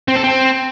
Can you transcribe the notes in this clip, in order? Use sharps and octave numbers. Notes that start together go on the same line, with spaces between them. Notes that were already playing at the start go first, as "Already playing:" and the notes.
C4
A4
C4